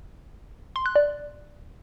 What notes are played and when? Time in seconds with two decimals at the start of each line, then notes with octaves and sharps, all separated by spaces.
0.76 C6
0.86 F#6
0.96 D5